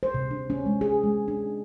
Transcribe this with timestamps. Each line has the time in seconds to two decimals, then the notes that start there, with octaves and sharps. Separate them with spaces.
0.03 C5
0.14 C3
0.31 D4
0.50 C#4
0.66 G#3
0.81 G#4
1.04 G#3
1.28 D4